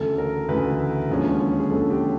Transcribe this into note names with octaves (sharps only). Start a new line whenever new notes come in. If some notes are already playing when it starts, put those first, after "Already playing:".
Already playing: D2 C#3 E3 A3 A4
A#4
D2 C#3 E3 A3 B4
D#2 D3 F3 G#3 C#4
G#4
D#2 D3 F3 G#3 C#4 A4
G4